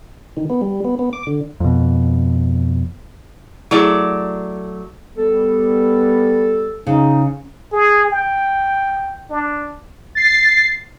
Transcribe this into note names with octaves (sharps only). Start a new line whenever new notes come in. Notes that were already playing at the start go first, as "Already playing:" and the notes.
D#3
B3
G3
B3
B3
D6
D3
F2 B2
F#3 A3 E4 G#4 D5 C6
G3 B3 A4
C#3 D#4
G#4
G5
D4
A6 C7